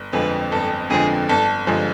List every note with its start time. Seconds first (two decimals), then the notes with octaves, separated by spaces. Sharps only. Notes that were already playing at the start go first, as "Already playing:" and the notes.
Already playing: G1
0.12 F2 D3 F3 G#3 B4
0.51 G1 A4
0.90 F2 D3 F3 G#3 G#4
1.29 G1 A4
1.67 G2 D3 F3 G#3